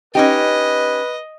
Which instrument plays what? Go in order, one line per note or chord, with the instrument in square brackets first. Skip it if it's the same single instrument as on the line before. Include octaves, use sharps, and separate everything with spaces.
[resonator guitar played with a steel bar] C#4 D#4 G4 [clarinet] B4 [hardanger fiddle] D#5